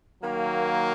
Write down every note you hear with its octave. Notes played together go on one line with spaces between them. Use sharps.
D#3 F#3 A#3